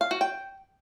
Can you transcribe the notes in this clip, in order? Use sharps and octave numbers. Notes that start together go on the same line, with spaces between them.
F5
F#4
G5